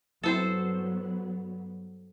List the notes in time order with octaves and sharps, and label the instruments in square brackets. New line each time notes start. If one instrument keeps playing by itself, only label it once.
[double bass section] G2 F#3 B3 [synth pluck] C4 E4 A6 [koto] A4 C5